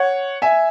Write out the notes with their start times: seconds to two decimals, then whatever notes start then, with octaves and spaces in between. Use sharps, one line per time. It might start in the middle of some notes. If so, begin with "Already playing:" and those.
Already playing: C#5 F#5
0.42 E5 G#5